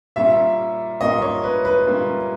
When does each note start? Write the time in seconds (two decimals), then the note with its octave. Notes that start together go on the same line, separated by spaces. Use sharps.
0.16 A#2 G3 A#3 C#4 E5
1.01 A#2 G3 A#3 C#4 D#5
1.22 C#5
1.44 B4
1.65 B4
1.87 A#2 G3 A#3 C#4